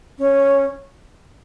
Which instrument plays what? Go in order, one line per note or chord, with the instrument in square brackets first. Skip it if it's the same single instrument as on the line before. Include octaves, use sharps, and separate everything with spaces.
[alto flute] C#4